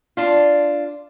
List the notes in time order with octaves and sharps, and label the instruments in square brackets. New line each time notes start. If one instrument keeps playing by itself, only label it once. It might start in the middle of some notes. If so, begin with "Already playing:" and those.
[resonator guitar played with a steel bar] D4 F4